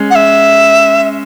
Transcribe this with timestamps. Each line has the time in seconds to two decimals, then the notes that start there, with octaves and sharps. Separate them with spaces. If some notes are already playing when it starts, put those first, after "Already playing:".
Already playing: G#3 C#4
0.10 F#5
0.15 E5